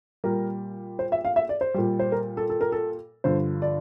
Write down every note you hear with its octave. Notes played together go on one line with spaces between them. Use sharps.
A#2 G3 A#4
C5
E5
F5
E5
D5
C5
A#2 G3
C5
A#4
A4
A4
A#4
A4
G2 D3 F3 C5
D5